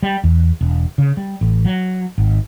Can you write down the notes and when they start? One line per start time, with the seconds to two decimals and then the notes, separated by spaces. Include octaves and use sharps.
0.03 G3
0.24 E2
0.61 E1
0.98 C#3
1.17 G3
1.41 A1
1.65 F#3
2.18 G#1